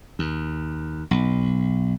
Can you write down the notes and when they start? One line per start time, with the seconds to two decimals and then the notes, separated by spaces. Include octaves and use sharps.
0.19 D#2
1.11 B1